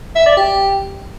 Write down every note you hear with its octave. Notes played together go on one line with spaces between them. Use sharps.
E5
D5
G4